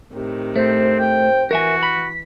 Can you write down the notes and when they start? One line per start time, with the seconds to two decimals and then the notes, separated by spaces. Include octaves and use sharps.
0.13 A2 C3 D#3
0.56 A3 C4 C5
0.99 G5
1.51 E3 F#4 A#4 E5 G#5
1.83 B5 B6